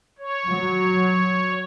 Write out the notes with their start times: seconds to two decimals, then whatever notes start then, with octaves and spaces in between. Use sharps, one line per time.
0.18 C#5
0.48 F#3